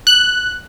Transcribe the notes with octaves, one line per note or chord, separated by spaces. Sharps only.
F#6